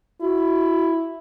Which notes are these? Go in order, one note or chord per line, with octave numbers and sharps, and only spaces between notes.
E4 F#4